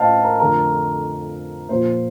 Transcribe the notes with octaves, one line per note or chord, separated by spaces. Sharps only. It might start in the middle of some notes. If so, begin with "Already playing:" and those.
Already playing: A2 C5 D#5 F5 G5 A5
A#4
F2 D3 F3 A3 A#4
A#2 F3 A#3 C5